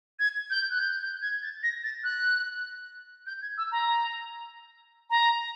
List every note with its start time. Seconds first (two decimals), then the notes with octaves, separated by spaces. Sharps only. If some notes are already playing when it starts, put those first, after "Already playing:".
0.19 G#6
0.50 G6
0.70 F#6
0.81 G6
1.02 G6
1.22 G#6
1.42 A6
1.63 A#6
1.84 A6
2.04 F#6
3.27 G6
3.42 G#6
3.58 E6
3.72 A#5
5.10 A#5